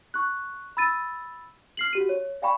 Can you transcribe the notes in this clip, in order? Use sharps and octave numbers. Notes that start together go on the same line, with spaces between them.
C#6 F#6
B5 E6 A6 D#7
F6 C7 F#7
F#4 G4 D#7
C#5
D5 F5 G5 G#5 B5 C#6